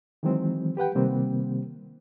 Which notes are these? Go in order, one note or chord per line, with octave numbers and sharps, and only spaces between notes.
D#3 E3 F#3 G#3 C4
G4 B4 F#5 G5
C3 D#3 G3 A#3 C4